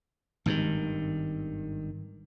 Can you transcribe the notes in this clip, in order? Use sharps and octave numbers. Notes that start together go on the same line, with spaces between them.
G#1 G2 D3 D#3